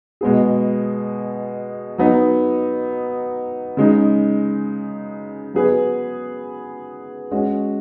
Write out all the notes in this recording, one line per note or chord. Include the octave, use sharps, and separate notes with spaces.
B2 G#3 B3 G#4
F#3 B3 D#4
C#3 G#3 D#4
F#3 B3 G#4 B4
G#3 C#4 F#4